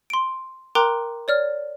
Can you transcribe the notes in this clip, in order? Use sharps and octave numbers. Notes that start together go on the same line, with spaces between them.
C6 D7
A#4 G5 A#5 C6 D6 F#6
C#5 D5 F6